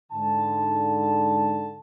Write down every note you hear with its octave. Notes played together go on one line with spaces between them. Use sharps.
G#2 D3 A5